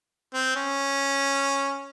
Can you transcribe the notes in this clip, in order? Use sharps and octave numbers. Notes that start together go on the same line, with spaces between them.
C4
C#4